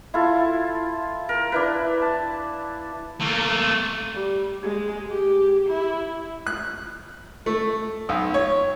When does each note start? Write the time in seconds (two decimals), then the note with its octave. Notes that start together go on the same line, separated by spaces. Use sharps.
0.14 E4 F4 A4
1.29 A#4
1.52 D4 E4 B4
2.02 A5
3.21 A3 A#3
4.15 G3
4.63 G#3
5.11 G4
5.68 E4
6.47 F#6
7.46 A3
8.09 B1
8.34 C#5